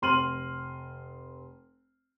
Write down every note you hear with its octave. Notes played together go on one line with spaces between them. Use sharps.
F1 C6 F6 D#7 F#7